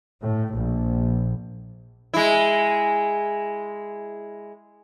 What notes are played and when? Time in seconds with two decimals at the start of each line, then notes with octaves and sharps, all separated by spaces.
0.21 A2
0.56 A#1
2.14 G#3 E4